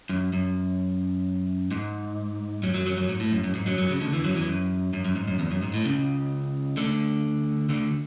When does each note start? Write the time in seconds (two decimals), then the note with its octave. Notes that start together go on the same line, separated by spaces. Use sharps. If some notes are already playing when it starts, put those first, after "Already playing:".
0.09 F#2
0.33 F#2
1.71 G#2
2.63 F#2 F#3
2.74 F#2 F#3
2.86 F#2 F#3
2.97 F#2 F#3
3.09 G#2
3.20 A2
3.31 F#2
3.44 F#2
3.55 G#2
3.66 F#2 F#3
3.78 F#2 F#3
3.89 C#2 C#3
4.01 D2 D3
4.13 E2 E3
4.24 F#2 F#3
4.35 E2 E3
4.47 F#2
4.93 F#2
5.05 F#2
5.15 G#2
5.28 F#2
5.39 E2
5.51 F#2
5.62 G#2
5.74 A2
5.85 C#2 C#3
6.77 D2 D3
7.69 D2 D3